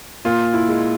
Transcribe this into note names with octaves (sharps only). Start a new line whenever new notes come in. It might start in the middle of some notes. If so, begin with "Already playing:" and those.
A#2 F4
E4
G#3